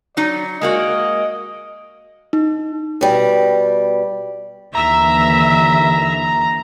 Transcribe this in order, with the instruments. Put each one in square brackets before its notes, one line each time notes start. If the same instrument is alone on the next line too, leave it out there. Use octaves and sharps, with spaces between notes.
[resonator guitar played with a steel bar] F#3 D#4 [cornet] D5
[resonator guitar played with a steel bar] G#3 A#3 F#4 [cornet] D#5
[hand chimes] D#4
[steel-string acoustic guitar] B2 G3
[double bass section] D#2 D3 E3 [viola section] E5 [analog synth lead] A#5